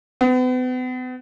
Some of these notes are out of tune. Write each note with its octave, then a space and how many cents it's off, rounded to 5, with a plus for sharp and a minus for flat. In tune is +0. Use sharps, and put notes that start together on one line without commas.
B3 +40